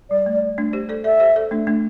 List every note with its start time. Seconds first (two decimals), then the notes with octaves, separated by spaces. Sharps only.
0.10 G3 D5
0.26 A3
0.58 A3 D4
0.73 G4 C5
0.89 A4 D5
1.04 A4 D5 E5
1.20 G4 C5
1.36 A4 D5
1.51 A3 D4
1.67 A3 D4